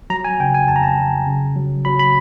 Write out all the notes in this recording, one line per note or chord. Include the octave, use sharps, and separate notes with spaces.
F#3 A#5
G#5
C#3 G5
G#5
F2 A5
A#5
A5
F#3
C#3
F#3
F#3 B5
B5